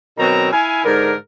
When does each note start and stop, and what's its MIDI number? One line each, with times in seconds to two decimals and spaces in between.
0.17 0.50 47
0.17 0.50 51
0.17 0.50 54
0.17 0.50 60
0.17 0.50 82
0.52 0.83 64
0.52 0.83 77
0.52 0.83 80
0.84 1.13 44
0.84 1.13 50
0.84 1.13 70